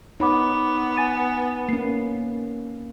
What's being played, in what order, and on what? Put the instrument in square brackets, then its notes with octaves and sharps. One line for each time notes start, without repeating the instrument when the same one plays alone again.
[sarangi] B3 [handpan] D#4 [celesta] C#5 B5 D6
[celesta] G#5 A6 D#7
[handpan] A#3 C#4 [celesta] C7